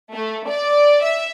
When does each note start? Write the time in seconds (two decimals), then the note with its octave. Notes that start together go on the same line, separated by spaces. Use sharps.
0.14 A3
0.48 D5
1.03 E5